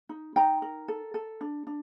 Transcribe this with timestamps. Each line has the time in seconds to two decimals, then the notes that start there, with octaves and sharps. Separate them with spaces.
0.09 D#4
0.36 D#4 G5 A#5
0.62 A#4
0.88 A4
1.14 A4
1.41 D4
1.67 D4